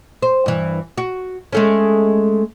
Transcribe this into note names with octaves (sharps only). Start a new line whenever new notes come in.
C5
G2 E3
F#4
G#3 A3 C#4